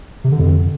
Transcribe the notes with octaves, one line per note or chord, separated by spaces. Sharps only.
C3
D3
F2